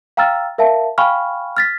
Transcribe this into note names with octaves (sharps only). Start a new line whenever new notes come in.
F5 G5 A#5 E6 F6 A6
A#4 E5 F5 A5
F5 G5 G#5 B5 C#6 F6
F6 A6 B6